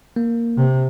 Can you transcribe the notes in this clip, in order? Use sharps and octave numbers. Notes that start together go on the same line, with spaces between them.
A#3
C3